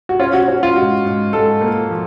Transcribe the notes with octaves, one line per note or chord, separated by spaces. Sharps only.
F#4
C#4 F4
F#4
C#4 F#4
F4
G#2 F#4
G#2
G#2 A4
A#3
F3